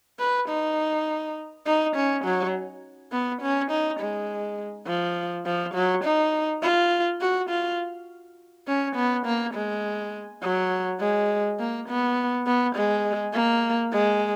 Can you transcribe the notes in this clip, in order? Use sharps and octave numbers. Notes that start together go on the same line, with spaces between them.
B4
D#4
D#4
C#4
F#3
B3
C#4
D#4
G#3
F3
F3
F#3
D#4
F4
F#4
F4
C#4
B3
A#3
G#3
F#3
G#3
A#3
B3
B3
G#3
A#3
G#3